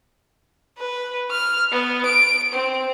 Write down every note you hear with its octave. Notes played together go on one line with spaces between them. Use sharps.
B4
F6
B3
D7
C4